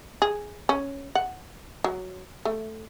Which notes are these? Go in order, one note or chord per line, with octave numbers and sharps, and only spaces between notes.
G#4
C#4
F#5
F#3
A3